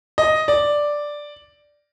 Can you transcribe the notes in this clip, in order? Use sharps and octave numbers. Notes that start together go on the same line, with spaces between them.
D#5
D5